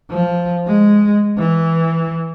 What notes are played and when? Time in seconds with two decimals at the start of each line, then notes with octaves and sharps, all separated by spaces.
0.11 F3
0.67 G#3
1.38 E3